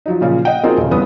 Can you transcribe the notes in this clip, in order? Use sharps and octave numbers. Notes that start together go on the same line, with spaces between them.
F3 F#3 D#4
A#2 C#3 F3
D#5 F#5 G5
A#3 C4 D#4 F4 F#4 G#4
D#1 C#3
G1 G2 E3 B3 B4 D#6